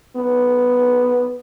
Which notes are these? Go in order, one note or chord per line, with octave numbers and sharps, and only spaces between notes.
B3